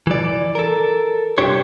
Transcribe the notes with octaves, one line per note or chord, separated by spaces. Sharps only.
E3 D5
A4 A#4
C2 F#2 D4 G4 C5 C#5